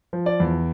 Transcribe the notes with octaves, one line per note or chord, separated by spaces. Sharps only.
F3
D5
E2